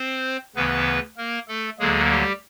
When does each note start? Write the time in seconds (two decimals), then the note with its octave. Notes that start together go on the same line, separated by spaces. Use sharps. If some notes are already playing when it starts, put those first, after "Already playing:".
Already playing: C4 C5
0.55 D2 C#3 E3 B3 B4
1.17 A#3 A#4
1.48 A3 A4
1.79 D2 D3 F#3 G#3 A#3 G#4
2.10 G3 G4